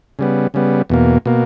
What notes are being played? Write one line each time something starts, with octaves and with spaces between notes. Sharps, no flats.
C#3 G3 B3
C#3 G3 B3
E2 B2 A#3
B2 A#3